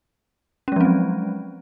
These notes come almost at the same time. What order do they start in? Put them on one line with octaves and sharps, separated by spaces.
C#4 G#3 F3 C4 F#3